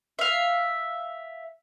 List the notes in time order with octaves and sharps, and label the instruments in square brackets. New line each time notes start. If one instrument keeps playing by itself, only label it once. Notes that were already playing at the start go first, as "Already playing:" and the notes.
[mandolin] E5 F5